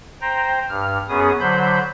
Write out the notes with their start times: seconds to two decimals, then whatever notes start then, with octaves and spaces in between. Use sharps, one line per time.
0.21 C5 G5 A#5
0.69 G2 F6
1.09 F#2 B3 C#4 G#4 D#6
1.40 D3 F#3 C5 B5 G6